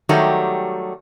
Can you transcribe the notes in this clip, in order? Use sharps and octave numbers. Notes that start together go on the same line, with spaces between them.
D#3 F#3 G3 A3 G4